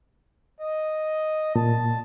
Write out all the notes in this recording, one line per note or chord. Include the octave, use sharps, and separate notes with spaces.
D#5
A#2 A5